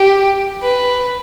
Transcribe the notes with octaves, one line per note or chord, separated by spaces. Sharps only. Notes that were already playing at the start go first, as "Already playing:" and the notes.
Already playing: G4
B4